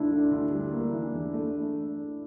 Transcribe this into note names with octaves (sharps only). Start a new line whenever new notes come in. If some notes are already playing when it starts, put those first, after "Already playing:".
Already playing: D2 D4 E4
D3
D2
G3
A#3
E3
E2
A3